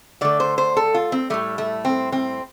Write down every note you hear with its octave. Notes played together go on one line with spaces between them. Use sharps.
D3 A3 D5
C5
C5
A4
F4
C4
A2 G3 A3
A3
C4
C4